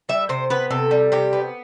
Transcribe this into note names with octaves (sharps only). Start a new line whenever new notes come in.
G3 E5
C3 C5
B3 B4
C3 A4
G3
C3 G4
B3